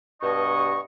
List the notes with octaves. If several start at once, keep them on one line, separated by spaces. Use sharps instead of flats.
G2 B2 D#5 C#6